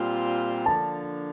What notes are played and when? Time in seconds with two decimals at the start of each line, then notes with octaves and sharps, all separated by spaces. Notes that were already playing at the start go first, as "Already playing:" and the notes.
Already playing: A#2 G3 C4 F4
0.65 D3 F3 A#3 D4 A5